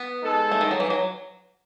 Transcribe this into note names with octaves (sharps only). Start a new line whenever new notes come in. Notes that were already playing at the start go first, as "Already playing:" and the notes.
Already playing: B3
G#3 D#4 A4
A3
D#3
F#3
E3
F#3